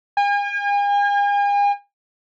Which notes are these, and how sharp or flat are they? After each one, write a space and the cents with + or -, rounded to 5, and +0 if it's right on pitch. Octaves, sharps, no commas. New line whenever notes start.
G#5 -40